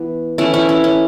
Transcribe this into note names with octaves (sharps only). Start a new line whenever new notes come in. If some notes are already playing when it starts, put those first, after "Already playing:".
Already playing: E3 B3
E3 A3 C#4 E4
C#4 E4
C#4
C#4